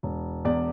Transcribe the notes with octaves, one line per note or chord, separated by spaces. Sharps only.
E1
E2 D5